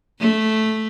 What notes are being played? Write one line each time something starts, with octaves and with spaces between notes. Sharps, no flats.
A3